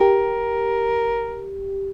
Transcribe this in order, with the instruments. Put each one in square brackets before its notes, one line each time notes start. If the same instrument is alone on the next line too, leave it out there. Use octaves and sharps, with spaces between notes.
[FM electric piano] G4 [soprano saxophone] A#4